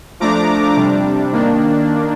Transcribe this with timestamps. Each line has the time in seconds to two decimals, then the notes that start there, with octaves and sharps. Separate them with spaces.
0.20 F3 A3 D4 A#5 D6
0.76 C3 G3 D4
1.32 D#3 A#3 D4